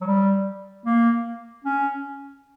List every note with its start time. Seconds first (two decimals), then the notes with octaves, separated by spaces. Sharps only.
0.01 F#3
0.06 G3
0.86 A#3
1.64 C#4